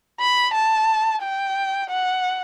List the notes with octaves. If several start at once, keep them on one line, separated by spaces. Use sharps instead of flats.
B5
A5
G5
F#5